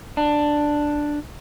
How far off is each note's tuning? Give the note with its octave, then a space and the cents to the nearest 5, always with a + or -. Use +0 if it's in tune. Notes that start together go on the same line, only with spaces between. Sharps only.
D4 +5